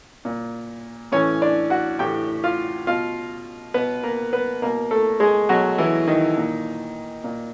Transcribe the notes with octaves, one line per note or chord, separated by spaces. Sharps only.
A#2
A2 E3 C#4 C#5
D4 D5
F#4 F#5
A2 E3 G4 G5
F4 F5
B2 F4 F5
B2 B3 B4
A#3 A#4
B3 B4
B2 A#3 A#4
A3 A4
G#3 G#4
B2 F#3 F#4
E3 E4
D#3 D#4
A#2
A#2